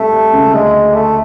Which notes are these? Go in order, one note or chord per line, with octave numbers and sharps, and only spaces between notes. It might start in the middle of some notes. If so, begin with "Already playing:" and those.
Already playing: C2 C3 A3
C2 C3
C#2 C#3
D2 D3 G#3
A3